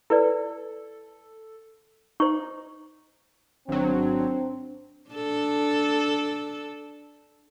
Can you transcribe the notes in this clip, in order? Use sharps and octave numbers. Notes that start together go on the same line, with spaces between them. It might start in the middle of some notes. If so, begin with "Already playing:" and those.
E4 A4 B4 D5
D#4 C5 C#6
G#1 F#3 C4 D4
D4 A4